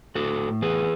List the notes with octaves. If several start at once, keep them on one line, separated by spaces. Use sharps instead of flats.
A2 F#4 A4
E3 G#4 B4